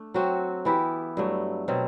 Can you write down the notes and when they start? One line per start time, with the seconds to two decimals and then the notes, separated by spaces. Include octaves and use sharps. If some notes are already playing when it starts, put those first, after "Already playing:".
Already playing: A3 D4
0.14 F#3 C4 F#4
0.65 E3 B3 E4 G4
1.17 G2 F#3 A3
1.68 B2 F#3 C4